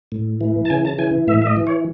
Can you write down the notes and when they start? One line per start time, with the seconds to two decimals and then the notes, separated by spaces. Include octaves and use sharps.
0.12 A2
0.41 E3
0.65 A5
0.70 C#3 G#5
0.85 A5
0.98 E3 G#5
1.27 A2 E5
1.42 E5
1.47 D#5
1.57 E3
1.67 C#5